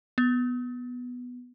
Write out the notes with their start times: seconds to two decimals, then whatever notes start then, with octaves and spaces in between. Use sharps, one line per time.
0.18 B3